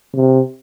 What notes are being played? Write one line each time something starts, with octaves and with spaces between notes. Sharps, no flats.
C3